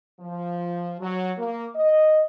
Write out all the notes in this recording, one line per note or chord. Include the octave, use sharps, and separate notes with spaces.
F3
F#3
A#3
D#5